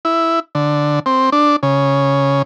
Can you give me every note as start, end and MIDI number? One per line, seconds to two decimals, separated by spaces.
0.05 0.40 64
0.55 0.99 50
1.06 1.30 60
1.32 1.56 62
1.63 2.42 49